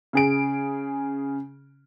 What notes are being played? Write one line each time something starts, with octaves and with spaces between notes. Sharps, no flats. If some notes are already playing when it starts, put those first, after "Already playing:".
C#3 G#4 D7